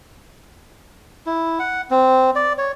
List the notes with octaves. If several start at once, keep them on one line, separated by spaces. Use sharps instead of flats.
E4
F#5
C4
D5
C#5